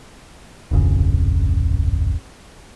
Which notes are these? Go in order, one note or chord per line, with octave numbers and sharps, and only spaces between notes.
D1 G#1 F2 C#3